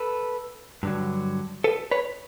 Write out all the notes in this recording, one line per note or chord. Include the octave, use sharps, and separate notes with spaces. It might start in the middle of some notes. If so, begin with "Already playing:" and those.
Already playing: A4 B4
G2 D3 F#3
A4 B4
B4 C#5